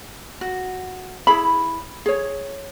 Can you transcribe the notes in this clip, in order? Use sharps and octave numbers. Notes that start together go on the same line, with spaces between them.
F#4
E4 G#4 B5
G#4 C#5